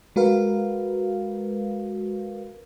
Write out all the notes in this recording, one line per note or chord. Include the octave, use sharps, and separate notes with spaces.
G#3 F#4 A#4 B4 F5